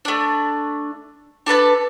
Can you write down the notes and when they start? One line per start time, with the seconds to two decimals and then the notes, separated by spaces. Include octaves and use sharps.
0.05 A3 D4
1.46 D4 A4 B4 A5